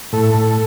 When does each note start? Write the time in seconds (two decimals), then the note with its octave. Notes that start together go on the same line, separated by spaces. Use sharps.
0.13 A2 A4
0.34 A2